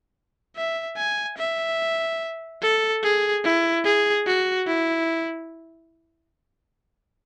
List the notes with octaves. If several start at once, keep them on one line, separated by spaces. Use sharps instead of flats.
E5
G#5
E5
A4
G#4
E4
G#4
F#4
E4